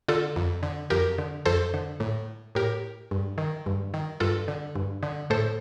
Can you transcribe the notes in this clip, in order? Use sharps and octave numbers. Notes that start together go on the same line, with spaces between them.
D3 F4 A4
F2
D3
F2 G4 A#4
D3
F2 A4 C5
D3
A2
A2 G4 A#4
G2
D#3
G2
D#3
G2 F4 A4
D3
G2
D3
A2 A4 C5